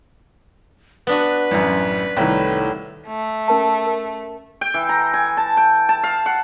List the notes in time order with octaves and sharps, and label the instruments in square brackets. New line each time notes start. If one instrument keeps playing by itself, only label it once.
[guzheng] B3 D4 F#4 [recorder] B4
[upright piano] A1 F#2
[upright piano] C2 D#3 [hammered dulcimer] A2
[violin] A3
[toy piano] C#4 A#4 A5
A#4
[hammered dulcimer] G5
E3
A#5
G#5
A5
G5
A5
F5
F#5